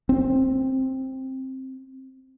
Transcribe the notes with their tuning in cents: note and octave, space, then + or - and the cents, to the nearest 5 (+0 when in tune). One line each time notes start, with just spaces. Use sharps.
C4 +10